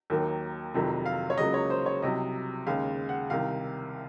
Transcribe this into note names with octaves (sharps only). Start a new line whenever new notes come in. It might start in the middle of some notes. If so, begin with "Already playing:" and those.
D#2 D#3 F#3 A#3
F1 F2 C3 D#3 F#3
F5
C#5
C#2 C#3 F#3 A#3 D#5
C#5
C5
C#5
C2 C3 F#3 D#5
D#2 C#3 G#3 F5
F#5
C2 C3 D#3 F5